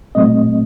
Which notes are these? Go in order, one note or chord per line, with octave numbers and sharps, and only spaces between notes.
A#2 F#3 A3 C4 D#5